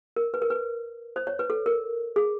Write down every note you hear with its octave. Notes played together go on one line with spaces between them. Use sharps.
A#4
B4
A#4
B4
C5
C#5
B4
A4
A#4
G#4